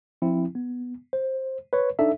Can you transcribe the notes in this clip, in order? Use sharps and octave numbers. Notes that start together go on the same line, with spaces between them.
F3 C4 E4
B3
C5
B4 C#5
D4 D#4 A4 E5